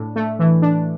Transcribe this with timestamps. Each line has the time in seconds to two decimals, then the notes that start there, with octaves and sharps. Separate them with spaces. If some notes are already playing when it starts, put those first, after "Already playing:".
Already playing: A2 D4
0.16 A3
0.39 E3
0.62 D4